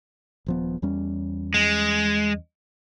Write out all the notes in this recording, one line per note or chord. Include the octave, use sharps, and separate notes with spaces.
D#1 F3 B3
E2 G3 C#4
G#3